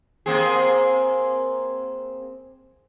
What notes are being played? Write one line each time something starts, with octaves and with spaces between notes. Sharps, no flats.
A#3 C4 G#4